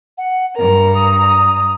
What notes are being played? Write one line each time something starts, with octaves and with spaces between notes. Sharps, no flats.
F#5
G2 A#4 A#5
D#6